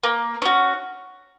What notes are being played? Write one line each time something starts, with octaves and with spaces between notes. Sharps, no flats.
A#3
C#4 F#4